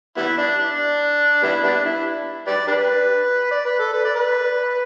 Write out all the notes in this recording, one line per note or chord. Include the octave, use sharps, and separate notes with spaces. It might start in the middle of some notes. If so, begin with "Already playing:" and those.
G3 B3 E4
D4
D4
G3 B3 E4
G3 B3 D4
E4
G4 B4 D5
D4 G4 B4
D5
B4
A4
B4
D5
B4